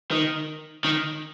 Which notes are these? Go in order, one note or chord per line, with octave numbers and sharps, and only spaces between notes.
D#3
D#3